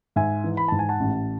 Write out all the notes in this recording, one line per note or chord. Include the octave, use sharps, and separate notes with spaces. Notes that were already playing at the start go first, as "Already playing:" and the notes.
G#2 E5 G#5
E3
B5
G#2 A5
G#5
F#5 A5
A1